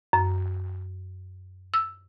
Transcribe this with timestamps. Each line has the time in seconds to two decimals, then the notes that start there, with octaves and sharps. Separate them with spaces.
0.13 F#2
1.74 E6